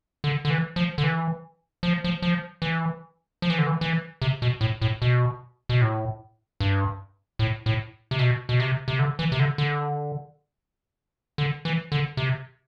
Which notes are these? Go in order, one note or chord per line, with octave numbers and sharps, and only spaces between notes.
D3
D3
E3
F3
D3
E3
F3
F3
F3
E3
F3
E3
D3
E3
E3
C3
B2
A2
A2
B2
B2
A2
G2
A2
A2
C3
B2
B2
C3
C3
D3
E3
C3
D3
D3
D3
E3
D3
C3